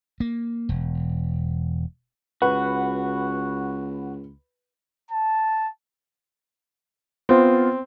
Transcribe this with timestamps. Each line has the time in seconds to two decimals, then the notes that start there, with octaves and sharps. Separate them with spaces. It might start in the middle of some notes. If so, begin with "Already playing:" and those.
0.20 A#3
0.69 E1
2.42 C#2 F#4 B4 F#5
5.11 A5
7.29 B3 C4 F4